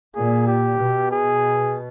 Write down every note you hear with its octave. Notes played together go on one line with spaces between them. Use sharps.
A#2 G#4
G4
B2
G#4